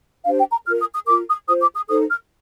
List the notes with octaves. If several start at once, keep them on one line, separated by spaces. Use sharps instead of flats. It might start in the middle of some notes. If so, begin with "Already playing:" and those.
D4 G4 C5 F5
G5
A#5
F4 A#4 F6
D#6
D#6
F4 A#4 D6
D#6
F4 C5 D#6
D6
D#6
D#4 A4 C5 D#6
F6